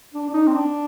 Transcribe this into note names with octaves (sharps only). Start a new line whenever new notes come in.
D4
D4
D#4
C4
D4